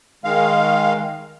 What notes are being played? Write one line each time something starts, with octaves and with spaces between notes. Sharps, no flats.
D#3 G#3 F5